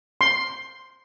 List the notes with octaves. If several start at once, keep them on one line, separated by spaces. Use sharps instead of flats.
C6